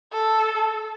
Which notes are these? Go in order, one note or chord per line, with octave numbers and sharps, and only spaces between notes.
A4